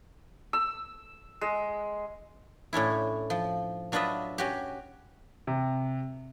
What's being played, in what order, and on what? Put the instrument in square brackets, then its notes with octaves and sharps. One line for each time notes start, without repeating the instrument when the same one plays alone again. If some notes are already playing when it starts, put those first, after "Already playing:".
[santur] E6
G#3
[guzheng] A2 C#4 D4 E4
F3
F#3 D4 F4 B4 D#5 E5
C#4 F#4 G4
[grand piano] C3